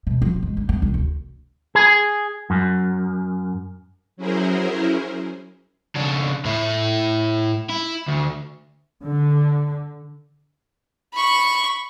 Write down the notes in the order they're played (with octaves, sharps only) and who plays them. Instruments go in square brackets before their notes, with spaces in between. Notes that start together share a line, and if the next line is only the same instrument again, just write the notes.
[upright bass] B2
F3
G#3
D3
B3
C2
D2
[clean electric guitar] G#4
F#2
[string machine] F#3 C#4 E4 G#4 A#4 C5
[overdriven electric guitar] C#3 D4
A2 E4
E4
D2
[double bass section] D3
[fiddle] B5 C#6